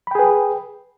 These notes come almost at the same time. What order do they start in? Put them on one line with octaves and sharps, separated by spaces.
B5 G5 G#4 B4